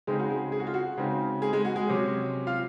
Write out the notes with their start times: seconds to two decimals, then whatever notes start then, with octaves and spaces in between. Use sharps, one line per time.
0.07 C#3 G#3 C4 D#4 G#4
0.20 F#4
0.30 G#3 G#4
0.52 G#4
0.60 F#4
0.67 F4
0.74 F#4
0.98 C#3 G#3 C4 D#4
1.42 G#3 G#4
1.53 G#3 G#4
1.65 F#4
1.76 G#3 G#4
1.87 C3 F#3 C#4
2.47 F4 F5